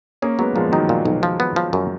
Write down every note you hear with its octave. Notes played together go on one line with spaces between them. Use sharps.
A#3 C#4 G#4
F#3 G#3 B3
A#2 F3 G#3
D#3 F#3 D#4
A#2
B1
F3
B3
F3
F#2